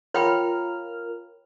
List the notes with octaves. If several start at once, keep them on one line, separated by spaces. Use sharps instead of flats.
F4 A#4 C#5 G5 B5 F6